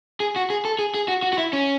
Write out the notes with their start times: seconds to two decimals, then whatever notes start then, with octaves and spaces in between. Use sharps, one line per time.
0.20 G#4
0.36 F#4
0.50 G#4
0.65 A4
0.79 G#4
0.94 G#4
1.08 F#4
1.23 F#4
1.33 F#4
1.38 E4
1.53 C#4